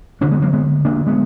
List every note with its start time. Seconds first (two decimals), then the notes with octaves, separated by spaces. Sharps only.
0.21 D2 D3 A#3 D4
0.31 G#3 B3
0.42 F#3 A#3
0.53 G#3 B3
0.85 A#3 D4
1.06 G#3 B3